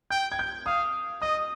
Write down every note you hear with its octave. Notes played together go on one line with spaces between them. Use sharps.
G5 G6
G#6
G6
F5 D#6
D#5 D#6